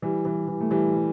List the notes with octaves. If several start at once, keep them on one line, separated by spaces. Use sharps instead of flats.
E3 G3
E3 G3
E3
A3
E3 G3
G3